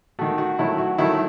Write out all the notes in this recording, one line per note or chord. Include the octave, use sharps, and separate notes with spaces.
D#3 A3 F#4
F#4
D#3 F#3 A3 E4
F#4
D#3 F#3 A3 E4